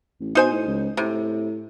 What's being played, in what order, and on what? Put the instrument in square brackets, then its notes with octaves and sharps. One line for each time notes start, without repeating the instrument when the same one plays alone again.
[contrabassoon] A1
[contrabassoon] B2 [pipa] D#4 C5 G#5
[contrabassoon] A2
C#2
[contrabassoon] A2 [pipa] C3